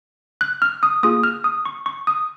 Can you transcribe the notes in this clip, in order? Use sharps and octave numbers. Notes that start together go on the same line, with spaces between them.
F#6
F6
D#6
A#3 F4 G#4 D#6
F6
D#6
C#6
C#6
D#6